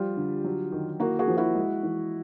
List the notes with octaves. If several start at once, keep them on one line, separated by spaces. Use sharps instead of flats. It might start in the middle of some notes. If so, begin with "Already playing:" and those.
Already playing: F3 G3 F4 G4
D3
F#3
D#3
A#3 E4 F#4
F#4 G#4
F3
E4 F#4
G#3
E3